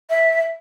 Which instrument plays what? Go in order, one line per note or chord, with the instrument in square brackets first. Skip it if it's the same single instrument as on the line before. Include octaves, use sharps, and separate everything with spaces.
[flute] E5